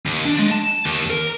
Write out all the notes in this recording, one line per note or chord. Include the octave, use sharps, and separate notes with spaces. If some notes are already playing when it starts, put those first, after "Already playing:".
D#2
D4
G#3
A5
D#2
A#4